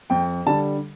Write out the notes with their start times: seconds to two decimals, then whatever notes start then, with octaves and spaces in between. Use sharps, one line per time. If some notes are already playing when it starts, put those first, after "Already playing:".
0.10 F2 G5
0.46 D3 G3 A5